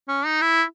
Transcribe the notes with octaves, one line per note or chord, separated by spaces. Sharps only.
C#4
D#4
E4